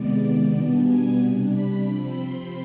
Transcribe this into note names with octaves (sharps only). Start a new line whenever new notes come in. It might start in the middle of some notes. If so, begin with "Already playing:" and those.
Already playing: C3 D#3 G#3 B3 D5
D5
B2 G3 B3 D4 D5
G#5
C3 G3 D4
B5
C3 F3 C4 B5
C6